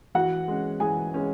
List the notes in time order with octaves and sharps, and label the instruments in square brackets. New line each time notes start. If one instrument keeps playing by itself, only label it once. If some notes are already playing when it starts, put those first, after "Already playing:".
[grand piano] E3 [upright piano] F#4 F#5
[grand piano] G#3 C#4
[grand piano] E3 [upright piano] G#4 G#5
[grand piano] G#3 C#4